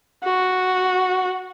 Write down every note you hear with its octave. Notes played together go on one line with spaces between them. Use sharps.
F#4